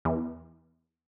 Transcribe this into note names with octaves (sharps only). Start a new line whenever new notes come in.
E2